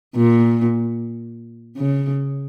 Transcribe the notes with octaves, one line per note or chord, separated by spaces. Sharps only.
A#2
C#3